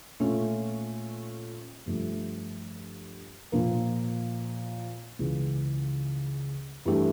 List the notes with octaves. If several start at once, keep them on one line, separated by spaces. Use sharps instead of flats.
A#2 A3 C#4 F4
G2 F3 A3
A#2 F3 A#3
C#2 C#3 E3
G2 E3 A3 D4 G4